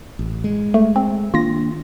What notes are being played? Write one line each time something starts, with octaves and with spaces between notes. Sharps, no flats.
A1
G#3
A3
C4
D#3 A#3 D4 F4 A#6